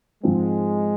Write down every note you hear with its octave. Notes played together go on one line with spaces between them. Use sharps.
G#2 F3 G#3 C4